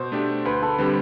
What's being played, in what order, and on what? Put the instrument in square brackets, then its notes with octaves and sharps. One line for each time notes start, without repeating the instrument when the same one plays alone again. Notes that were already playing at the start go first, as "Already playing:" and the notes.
Already playing: [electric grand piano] B2 [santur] C5
[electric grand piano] A3 D4 G4
[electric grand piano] D2 [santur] B4
[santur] A4
[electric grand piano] D3 G3 C4 G4 [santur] B4